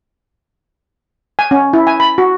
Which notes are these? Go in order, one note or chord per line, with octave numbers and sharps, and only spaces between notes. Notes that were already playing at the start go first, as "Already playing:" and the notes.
G#5
C#4
E4
G#5
B5
F#4